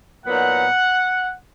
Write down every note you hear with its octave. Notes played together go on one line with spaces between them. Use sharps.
A#2 F#3 B3 D#4 F#5